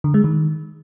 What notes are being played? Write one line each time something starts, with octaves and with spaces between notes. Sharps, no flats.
D3
G#3
D#3